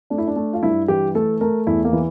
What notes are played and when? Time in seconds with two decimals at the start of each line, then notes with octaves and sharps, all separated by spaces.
0.10 A3 D4
0.18 E4
0.27 D4
0.36 A3
0.53 F4
0.62 G2 E4
0.88 E3 G4
1.15 A3 A4
1.41 A3 A#4
1.67 E2 E4
1.85 A#3
1.93 E3